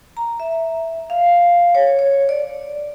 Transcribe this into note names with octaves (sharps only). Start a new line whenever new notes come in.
A#5
E5
F5
C#5
C#5
D5